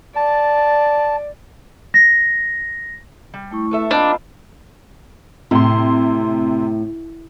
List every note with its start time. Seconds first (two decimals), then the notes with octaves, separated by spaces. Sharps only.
0.16 D5 A5
1.94 A#6
3.34 G3
3.51 A3 E4 C#6
3.71 B3 A4 E5
3.91 A#3 C4 D4 F4 D#5 B5
5.51 A2 C3 C6